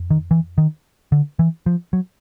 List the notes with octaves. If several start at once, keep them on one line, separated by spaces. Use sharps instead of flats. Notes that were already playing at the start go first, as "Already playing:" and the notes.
Already playing: F2
D#3
E3
D#3
D3
E3
F3
F#3